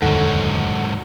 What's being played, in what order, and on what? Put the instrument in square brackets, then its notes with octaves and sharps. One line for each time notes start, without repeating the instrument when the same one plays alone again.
[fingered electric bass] D#1 F2 D3 [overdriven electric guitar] G#2 F#3 [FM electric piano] D#3 A4 F#5